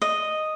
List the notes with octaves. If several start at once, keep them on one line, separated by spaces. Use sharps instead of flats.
D#5